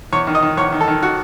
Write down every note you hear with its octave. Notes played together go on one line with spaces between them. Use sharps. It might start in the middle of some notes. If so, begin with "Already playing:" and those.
E2 C#5
D#3
D#5
D#3
E2 C#5
D#3
A4
D#3
F#4